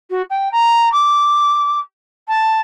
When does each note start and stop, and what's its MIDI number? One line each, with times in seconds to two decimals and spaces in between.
0.10 0.22 66
0.30 0.49 79
0.52 0.89 82
0.92 1.78 86
2.28 2.61 81